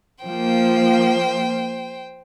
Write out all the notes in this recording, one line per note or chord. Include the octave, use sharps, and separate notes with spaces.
F3 A#3 C5 G5